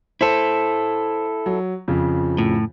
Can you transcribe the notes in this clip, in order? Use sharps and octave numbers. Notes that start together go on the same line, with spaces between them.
E4 A4 C5
F#3
F2 C#3 F3
A2